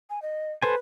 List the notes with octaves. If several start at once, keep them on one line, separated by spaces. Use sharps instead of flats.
G#5
D#5
A4 B4 C5 G#5